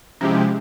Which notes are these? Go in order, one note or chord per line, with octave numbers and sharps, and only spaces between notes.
C3 F3 G#3 C#4 E4 G4